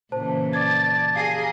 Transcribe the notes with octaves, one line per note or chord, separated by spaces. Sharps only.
A#2 C#3 E3 C5 A5
D5 A5 D6 G#6
G4 G#4 A#4 F5 G#6 C7